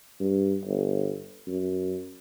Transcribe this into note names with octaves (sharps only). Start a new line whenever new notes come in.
G2
G1
F#2